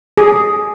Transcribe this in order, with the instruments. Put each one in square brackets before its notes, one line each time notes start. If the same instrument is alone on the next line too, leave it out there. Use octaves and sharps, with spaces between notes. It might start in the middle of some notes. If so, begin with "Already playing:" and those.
[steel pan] G#4